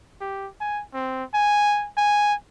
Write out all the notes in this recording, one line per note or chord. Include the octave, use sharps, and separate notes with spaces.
G4
G#5
C4
G#5
G#5